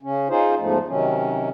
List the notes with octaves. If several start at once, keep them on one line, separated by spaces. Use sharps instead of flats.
C#3 C#4
D#4 F4 G#4 C5
E2 G#2 F3 A3
C3 D#3 F#3 C#4